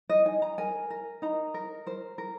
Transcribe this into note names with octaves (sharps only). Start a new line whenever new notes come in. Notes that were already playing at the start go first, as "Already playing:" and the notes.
D#5
D#4 G#5
A#5
A#4 G#5
A#4
D#4 A#5
A#4
A#4 C5
A#4